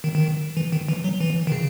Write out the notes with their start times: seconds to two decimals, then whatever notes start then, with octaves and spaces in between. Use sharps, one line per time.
0.04 D#3
0.15 D#3
0.57 E3
0.72 D#3
0.89 E3
1.04 F#3
1.21 E3
1.47 D#3
1.52 C#3